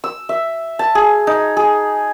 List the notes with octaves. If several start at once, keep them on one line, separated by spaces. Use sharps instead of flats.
E6
E5
A5
G#4
D#4
G#4